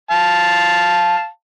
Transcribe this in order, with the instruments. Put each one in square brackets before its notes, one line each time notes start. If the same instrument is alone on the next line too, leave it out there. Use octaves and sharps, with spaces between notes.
[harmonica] F5 A5